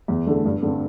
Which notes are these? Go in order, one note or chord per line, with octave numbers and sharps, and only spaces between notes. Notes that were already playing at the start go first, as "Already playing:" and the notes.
E2
D3 A3
G2
D3 A3 C4